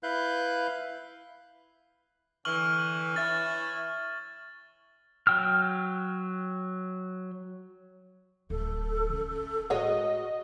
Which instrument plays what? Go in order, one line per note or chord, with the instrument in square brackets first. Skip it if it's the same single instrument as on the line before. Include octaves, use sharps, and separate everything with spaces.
[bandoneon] E4 B4 F5 F#6 G6
[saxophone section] D3 E3 [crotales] C#6 F6 F#7
[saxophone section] E3 C#5 E5 [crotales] A6
[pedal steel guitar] F#3 G5 E6 F6
[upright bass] D1 [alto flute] A4
[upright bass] D3 C#4
[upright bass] A2 [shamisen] G#3 C#5 F#5 [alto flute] F#4 [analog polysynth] D#5